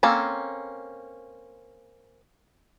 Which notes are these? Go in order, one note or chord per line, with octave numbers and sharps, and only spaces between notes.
A#3 C4 C#4 A4